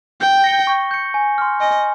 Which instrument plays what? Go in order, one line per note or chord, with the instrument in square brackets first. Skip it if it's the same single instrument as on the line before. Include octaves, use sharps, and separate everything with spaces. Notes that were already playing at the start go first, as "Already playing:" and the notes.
[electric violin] G5 [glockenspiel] G6
[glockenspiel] A#6 C#7 G7
C#6
G6 C#7
G#5
C6 F6
[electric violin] D#5 [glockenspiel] G#5